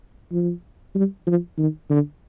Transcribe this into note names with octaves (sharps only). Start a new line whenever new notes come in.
F3
G3
F3
D#3
D3